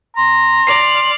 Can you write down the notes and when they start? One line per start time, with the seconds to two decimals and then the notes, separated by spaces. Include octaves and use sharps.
0.16 A#5 C6
0.67 D5 F6 C7 F#7